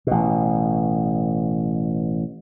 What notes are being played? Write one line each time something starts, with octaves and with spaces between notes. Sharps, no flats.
A1 B2